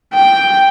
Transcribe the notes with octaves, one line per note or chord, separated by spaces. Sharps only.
G5